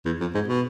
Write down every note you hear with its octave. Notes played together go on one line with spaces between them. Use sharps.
E2
F2
G#2
B2